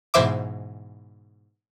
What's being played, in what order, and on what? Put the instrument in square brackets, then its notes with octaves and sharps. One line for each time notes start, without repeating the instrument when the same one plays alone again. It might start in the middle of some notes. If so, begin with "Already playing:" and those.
[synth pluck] G#2 B2 E3 C5 E5 D6